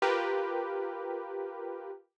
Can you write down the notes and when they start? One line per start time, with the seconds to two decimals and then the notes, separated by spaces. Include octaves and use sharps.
0.02 F4 G4 A#4 B4